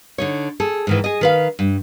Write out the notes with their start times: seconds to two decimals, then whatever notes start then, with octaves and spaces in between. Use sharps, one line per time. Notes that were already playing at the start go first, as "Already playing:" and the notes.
0.18 D3 D#4 C#5
0.60 G#4 A4
0.87 G#2 D#3 E3
1.04 G#4 D#5
1.21 D#3 B4 F5
1.59 G2